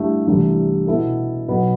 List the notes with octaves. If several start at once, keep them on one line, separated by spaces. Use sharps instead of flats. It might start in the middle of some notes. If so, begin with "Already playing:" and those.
Already playing: G2 D3 A3 E4 G4
C2 C3 E3 A3 D4
B2 B3 E4 A4
B1 B2 B3